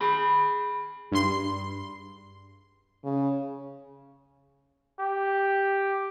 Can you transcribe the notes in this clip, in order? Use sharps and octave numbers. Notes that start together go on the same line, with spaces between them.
G#4 B5
G2 C6
C#3
G4